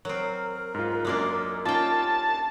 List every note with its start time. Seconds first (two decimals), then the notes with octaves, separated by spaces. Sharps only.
0.05 F#3 C4 A#4
0.74 G#2 F4
1.05 F#2 F#3 G#3 A#3 D4
1.65 A#3 C#4 D#4 F4 G5 A5